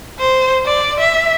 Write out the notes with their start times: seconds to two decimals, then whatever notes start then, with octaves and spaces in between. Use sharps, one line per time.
0.19 C5
0.66 D5
1.00 E5